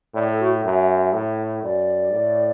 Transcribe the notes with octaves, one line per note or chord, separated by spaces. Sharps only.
A2 D5
A4
F#4
F#2 E5
A2
F#2 D5
A2